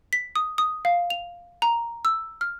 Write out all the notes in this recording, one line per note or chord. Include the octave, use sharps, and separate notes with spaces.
B6
D#6
D#6
F5
F7
A#5
E6
F6